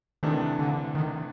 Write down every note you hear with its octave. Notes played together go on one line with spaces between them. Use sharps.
C3 D#3 E3 A3 D4
D3
D#3